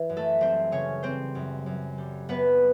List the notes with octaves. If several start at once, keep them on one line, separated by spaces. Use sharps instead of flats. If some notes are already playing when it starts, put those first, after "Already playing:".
Already playing: E3
F#2
A3 A4
G3 C4 C5
C#3 C#4 C#5
G3 C4 C5
F#2
F#2
G3
F#2 B3 B4